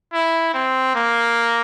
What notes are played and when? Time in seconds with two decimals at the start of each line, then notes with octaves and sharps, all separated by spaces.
0.13 E4
0.54 C4
0.95 A#3